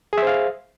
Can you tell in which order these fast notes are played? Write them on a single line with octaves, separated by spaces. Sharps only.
G#4 E5 C5 F5